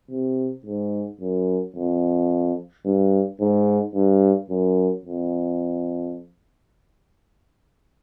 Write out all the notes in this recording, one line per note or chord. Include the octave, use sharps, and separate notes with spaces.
C3
G#2
F#2
F2
G2
G#2
G2
F#2
F2